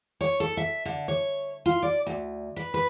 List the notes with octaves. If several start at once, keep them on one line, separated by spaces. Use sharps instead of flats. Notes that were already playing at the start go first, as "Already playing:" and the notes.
C#5
A4
E5
D3
C#5
F4
D5
D2
B4
B4